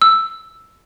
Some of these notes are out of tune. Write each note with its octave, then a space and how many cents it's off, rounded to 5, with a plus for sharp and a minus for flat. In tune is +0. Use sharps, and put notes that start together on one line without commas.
E6 +5